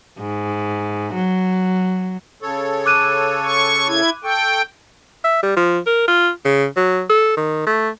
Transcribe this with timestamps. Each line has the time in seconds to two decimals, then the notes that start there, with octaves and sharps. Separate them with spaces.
0.19 G#2
1.14 F#3
2.42 C#3 A4 C#5
2.86 D6 F#6 D#7
3.44 C#6
3.88 E4 G#6
4.24 A4 G5 C#6
5.24 E5
5.43 G3
5.57 F3
5.86 A#4
6.08 F4
6.45 C#3
6.77 F#3
7.10 A4
7.37 D#3
7.67 A3